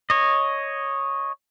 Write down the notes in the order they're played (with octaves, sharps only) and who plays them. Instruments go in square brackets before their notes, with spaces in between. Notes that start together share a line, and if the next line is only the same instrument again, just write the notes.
[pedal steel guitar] C#5 D#5